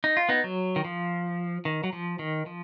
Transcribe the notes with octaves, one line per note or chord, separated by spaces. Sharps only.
D#4
F4
B3 D#4
F#3
D#3
F3
D#3
F#3
F3
D#3
F3